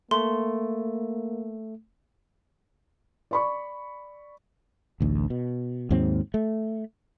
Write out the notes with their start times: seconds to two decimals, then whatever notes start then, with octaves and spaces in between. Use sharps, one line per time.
0.11 A3 A#3 C6
3.31 D5 B5 C#6
5.00 A1 D2
5.30 B2
5.91 D#2 G#2 F#3 C4
6.34 A3